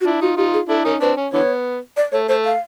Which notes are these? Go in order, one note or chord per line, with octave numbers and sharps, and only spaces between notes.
F#4
D4 E4 F4
D#4 F4 F#4
D#4 F4 G4
G#4
D4 E4 A4
C#4 D#4 A#4
C4 D4 B4
C#4
D3 E3 B3 C#5
D5
A3 C#5
A3 C5
F5